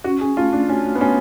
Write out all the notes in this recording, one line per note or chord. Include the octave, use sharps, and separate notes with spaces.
C#4 F#4
G#4
A3 F4
D4
C#4 F#4
B3
A3 C#4